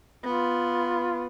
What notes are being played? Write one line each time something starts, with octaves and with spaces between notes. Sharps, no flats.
B3 F4